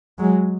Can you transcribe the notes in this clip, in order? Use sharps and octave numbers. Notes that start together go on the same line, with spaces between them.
F#3 G#3